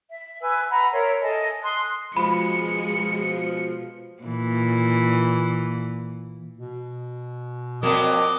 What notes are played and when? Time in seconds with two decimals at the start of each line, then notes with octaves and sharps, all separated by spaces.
0.08 E5
0.41 B4 G#5 E6
0.70 F#5 A#5 B5
0.92 A#4 C5 C#5 E5
1.21 A4 D#5 G#5 A5
1.63 C6 D#6 F#6
2.17 B2 F3 G#3 B5 C#7
4.23 A#2 E3
6.58 B2
7.83 F2 F#3 A#3 C4 A#4 D5 D#5 D6